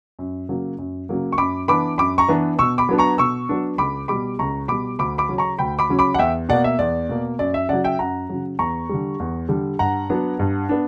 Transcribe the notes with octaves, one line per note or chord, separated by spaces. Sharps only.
F#2
C#3 F#3 A#3
F#2
C#3 F#3 A#3
C#6
F#2 B5 D6
E3 B3 D4 B5 D6
F#2 B5 D6
A#5 C#6
E3 B3 D4
B2 C#6 E6
B5 D6
F#3 B3 D4
A#5 C#6
B2 C#6 E6
F#3 B3 D4
C#2 B5 D6
B2 G3 B5 D6
C#2 A#5 C#6
B2 G3 B5 D6
D2 B5 D6
B5 D6
C#3 F#3 C#4
A#5 C#6
D2 G5 B5
B5 D6
C#3 F#3 C#4
B5 D6
F#5
E2 E5 G5
B2 A#3 D5 F#5
E5
E2 D5
B2 A#3
F#2 D5
E5
C#3 F#3 D5 F#5
E5 G5
F#2 F#5 A#5
C#3 F#3
E2 A#5 C#6
D3 G3
E2
D3 G3
G2 F#5 A#5
F#3 B3 D4
G2
B3 D4